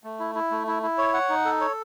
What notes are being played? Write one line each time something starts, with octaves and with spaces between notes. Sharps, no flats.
A3
E4
E4
A3
E4
E4
C#5
F#5
D#4
A4
C#5